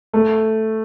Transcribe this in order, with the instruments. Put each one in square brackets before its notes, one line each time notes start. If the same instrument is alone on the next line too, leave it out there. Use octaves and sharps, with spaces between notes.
[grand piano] A3